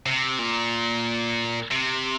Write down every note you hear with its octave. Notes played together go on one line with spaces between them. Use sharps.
C3
A#2
C3